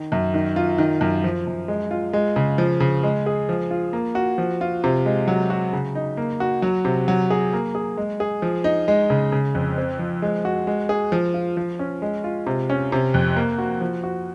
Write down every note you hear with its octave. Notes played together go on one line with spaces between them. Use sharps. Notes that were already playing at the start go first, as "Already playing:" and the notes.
Already playing: D#3
F#2
D#3
F4
D#3
F#2
F3
F#2
G#3
F4
G#3
C#3
F3
C#3
G#3
G#4
F3
F4
A#3
F#4
F3
F4
C3
G#3
F#3
F#4
C#3
D#4
A#3
F#4
F#3
C3
F#3
G#4
A#3
G#4
G#3
G#4
F3
D#4
G#3
C#3
C#3
F2
C4
F3
G#3
F#4
G#3
G#4
F3
F4
F3
C#4
G#3
F4
C3
C#4
C3
F2
A#3
F#4
F3
F#4